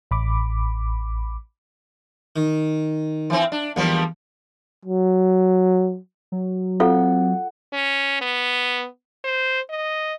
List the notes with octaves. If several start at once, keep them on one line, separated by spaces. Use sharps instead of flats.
A1 B5 D6
D#3
E3 C4
D4
E2 F3 G3 A#3
F#3
F#3
C4 F4 A4 F5 F#5
C#4
B3
C5
D#5